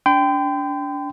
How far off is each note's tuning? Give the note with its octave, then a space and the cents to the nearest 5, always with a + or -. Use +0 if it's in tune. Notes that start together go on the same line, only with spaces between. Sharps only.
D4 -30 G5 +0 C6 -45